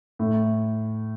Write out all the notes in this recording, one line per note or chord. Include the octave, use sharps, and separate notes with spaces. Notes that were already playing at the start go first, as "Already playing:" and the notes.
A2